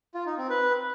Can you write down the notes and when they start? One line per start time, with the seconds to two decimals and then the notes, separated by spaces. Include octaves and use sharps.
0.14 F4
0.26 D#4
0.38 C4
0.50 B4